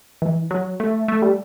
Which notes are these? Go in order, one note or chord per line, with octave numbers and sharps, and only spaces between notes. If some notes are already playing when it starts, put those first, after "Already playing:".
E3
F#3
A3
A3
G3